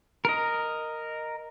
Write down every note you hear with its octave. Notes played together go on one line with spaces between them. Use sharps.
A#4 D#5